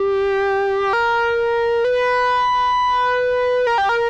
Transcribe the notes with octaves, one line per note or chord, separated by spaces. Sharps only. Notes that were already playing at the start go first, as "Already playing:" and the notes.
Already playing: G4
A#4
B4
A#4
G4
A#4